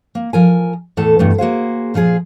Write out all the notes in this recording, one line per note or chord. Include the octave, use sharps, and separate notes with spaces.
A#3
F3 A#4 G#5
E2 A2 A4 A5
E2 G2 B2 A3
A#3 F#4 G#4 C5
A#2 F3 F4 G#4